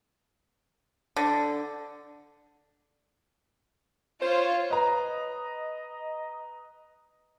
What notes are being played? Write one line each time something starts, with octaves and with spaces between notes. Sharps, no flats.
D3
F4 C5 C#5
B4 D#5 A#5